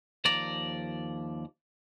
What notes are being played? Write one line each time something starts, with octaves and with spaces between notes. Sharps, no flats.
D#2 F3 D5 A#5